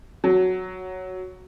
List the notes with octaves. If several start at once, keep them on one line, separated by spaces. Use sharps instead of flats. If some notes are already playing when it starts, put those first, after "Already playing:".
F#3